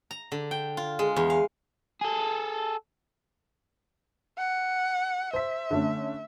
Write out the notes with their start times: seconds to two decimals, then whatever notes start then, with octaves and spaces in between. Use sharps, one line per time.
0.11 A#5
0.32 D3
0.51 G5
0.77 F4
0.99 G#3
1.16 E2
1.30 F5
2.01 G#4 A4
4.38 F#5
5.33 C5 E5 B6
5.71 D3 A3 C#4